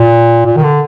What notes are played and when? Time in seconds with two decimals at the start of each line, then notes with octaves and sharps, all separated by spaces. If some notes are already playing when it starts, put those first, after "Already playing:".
Already playing: A#2
0.45 A#2
0.56 D#3
0.63 D3